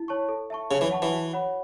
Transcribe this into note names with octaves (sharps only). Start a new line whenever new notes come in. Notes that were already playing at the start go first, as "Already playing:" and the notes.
Already playing: E4
C#5 A5 C#6
A4
E5 A5 C#6
C#3 C#5
E3
F#5 A5 C#6
E3
F#4
C#5 F#5 B5